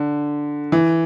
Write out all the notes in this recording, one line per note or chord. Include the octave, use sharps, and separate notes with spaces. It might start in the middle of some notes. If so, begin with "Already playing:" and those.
Already playing: D3
E3